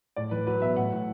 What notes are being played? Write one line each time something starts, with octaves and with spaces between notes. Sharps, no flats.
A2 D5
E3 B4
F#3 B4
B2 E5
A2 F#5
A2